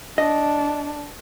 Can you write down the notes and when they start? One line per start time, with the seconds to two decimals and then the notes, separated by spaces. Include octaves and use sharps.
0.18 D4 D#5